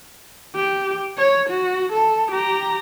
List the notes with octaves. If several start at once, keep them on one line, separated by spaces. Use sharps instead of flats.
G4
C#5
F#4
A4
G4 A#5